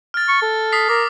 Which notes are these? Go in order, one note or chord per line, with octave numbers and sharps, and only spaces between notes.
F6 A6
C#6
A4
D#6 B6 C7
A#4 D6